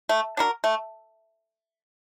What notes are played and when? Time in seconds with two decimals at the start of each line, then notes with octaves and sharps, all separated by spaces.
0.09 A3
0.37 D4 F#4 A#4
0.64 A3